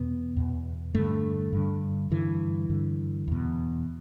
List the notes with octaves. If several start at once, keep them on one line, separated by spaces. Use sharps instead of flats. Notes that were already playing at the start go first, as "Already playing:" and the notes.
Already playing: E2 B2 B3
E2 B2
G2 D3 A3
G2 D3
G2 D3 E3
G2 D3
E2 B2